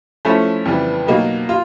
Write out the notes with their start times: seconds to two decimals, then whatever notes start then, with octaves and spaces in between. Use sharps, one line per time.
0.25 F3 A3 C#4 E4 A4
0.65 F2 C#3 E3 G3 B3
1.07 B2 F#3 A#3 D#4 G4
1.49 F4